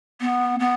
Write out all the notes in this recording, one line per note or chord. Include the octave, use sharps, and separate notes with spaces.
B3
B3